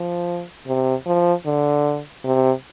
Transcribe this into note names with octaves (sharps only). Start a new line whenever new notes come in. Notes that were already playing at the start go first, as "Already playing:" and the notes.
Already playing: F3
C3
F3
D3
C3